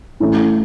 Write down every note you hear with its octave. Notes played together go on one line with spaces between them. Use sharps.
A2 E3 A3 C#4